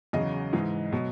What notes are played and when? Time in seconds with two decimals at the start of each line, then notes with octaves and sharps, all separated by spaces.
0.13 E2 C#3 F#3 D#5
0.53 G#2 E3 G#3
0.92 B2 F#3